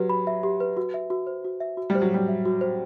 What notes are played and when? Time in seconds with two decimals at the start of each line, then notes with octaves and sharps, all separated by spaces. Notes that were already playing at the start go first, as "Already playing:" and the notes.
Already playing: F#3 G4 B4
0.10 B5
0.27 E5
0.43 G4
0.60 B4
0.77 F#4
0.94 E5
1.10 F#4
1.27 C5
1.45 F#4
1.60 E5
1.77 F#4
1.90 G3
1.95 C5
2.02 F#3
2.11 G3 F#4
2.28 E5
2.45 F#4
2.61 C5